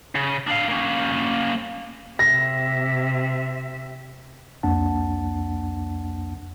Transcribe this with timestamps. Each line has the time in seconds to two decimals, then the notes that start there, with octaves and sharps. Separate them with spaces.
0.15 C#3
0.47 D4 F5
0.68 A#3 C#4
2.19 C3 E5 A#6
4.63 C2 F2 A#3 D4 F#5 A5